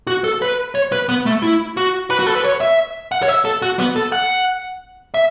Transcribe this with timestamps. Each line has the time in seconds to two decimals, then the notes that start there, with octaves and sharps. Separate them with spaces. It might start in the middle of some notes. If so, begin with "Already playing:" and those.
0.07 F#4
0.24 A4
0.42 B4
0.75 C#5
0.92 B4
1.09 B3
1.26 A3
1.43 E4
1.77 F#4
2.10 B4
2.19 F#4
2.27 A4
2.35 B4
2.44 C#5
2.61 E5
3.12 F#5
3.23 C#5
3.28 E5
3.45 A4
3.62 F#4
3.79 B3
3.96 A4
4.12 F#5
5.14 E5